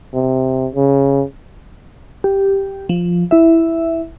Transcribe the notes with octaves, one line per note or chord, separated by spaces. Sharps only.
C3
C#3
G4
F3
E4 E5